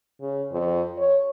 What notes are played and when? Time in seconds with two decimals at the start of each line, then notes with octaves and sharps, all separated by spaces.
0.21 C#3
0.51 F2
0.97 C#5